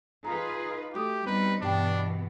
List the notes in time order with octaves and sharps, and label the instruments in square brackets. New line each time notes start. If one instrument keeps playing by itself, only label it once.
[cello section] D#4 F4 B4 [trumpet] G#4 [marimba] A#5
[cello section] A3 [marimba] F#4 D6 D#6 [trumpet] G4
[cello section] G3 C4 D#4 [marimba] B3 [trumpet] B4
[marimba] G2 G5 [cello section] B2 E3 B3 [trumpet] D4